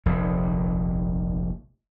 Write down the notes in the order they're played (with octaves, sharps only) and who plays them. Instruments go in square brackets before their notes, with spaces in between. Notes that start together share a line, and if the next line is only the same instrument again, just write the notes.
[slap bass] F1 A#1 D#2